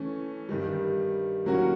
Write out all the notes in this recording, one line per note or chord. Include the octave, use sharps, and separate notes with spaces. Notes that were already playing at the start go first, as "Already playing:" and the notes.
Already playing: E3 A3 C#4
G2 D#3 G3
A2 F#3 A#3 C#4 F#4